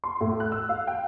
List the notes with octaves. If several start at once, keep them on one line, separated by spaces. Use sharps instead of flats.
C6
A2
F#6
E6
F5
G5